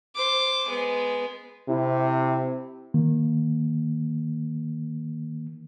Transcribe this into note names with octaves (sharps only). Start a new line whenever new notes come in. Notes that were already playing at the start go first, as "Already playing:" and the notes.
C5 D6
G#3 B3
C3 E4
D#3 A#3